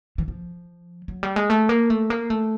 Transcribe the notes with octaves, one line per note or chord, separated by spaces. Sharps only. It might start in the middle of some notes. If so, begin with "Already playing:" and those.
E3
F3
F#3
G3
G#3
A3
A#3
A3
A#3
A3